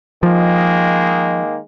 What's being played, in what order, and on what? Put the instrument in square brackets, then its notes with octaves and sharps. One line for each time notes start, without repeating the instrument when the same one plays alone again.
[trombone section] D#3 G#3 A#3 [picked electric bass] F3